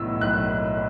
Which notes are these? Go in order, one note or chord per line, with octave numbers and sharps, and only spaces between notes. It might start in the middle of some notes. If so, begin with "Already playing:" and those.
Already playing: B1 A2 E3 B3 E6
B1 F#6